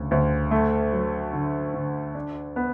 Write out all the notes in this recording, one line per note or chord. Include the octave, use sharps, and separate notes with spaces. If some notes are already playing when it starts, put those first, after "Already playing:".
Already playing: D2 C#3
D2
A3
F#3
D3
D3
D4
B3